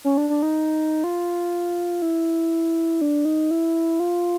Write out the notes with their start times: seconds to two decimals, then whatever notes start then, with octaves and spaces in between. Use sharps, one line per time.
0.05 C#4
0.17 D4
0.30 D4
0.42 D#4
1.04 F4
2.02 E4
3.01 D4
3.25 D#4
3.51 E4
4.00 F4